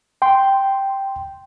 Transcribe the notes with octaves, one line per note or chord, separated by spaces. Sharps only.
G5 C6